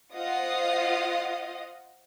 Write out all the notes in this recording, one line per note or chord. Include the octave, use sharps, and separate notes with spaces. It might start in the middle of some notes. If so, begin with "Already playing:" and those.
F4 C5 D#5 F5 F#5 D#6